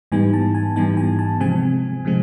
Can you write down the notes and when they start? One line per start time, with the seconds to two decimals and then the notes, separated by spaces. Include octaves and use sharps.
0.12 G#2 E3 G3 B3 D#4 G#5
0.33 A5
0.55 G#5
0.76 G#2 E3 G3 B3 D#4 G#5
0.97 G#5
1.19 A5
1.40 C3 F3 G#3 C4 G#5
2.05 C3 F3 G#3 C4